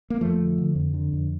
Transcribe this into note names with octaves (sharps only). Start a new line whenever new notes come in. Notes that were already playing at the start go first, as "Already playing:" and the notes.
A#3
F2 F3 A3
D3
D3
F2
D3
F2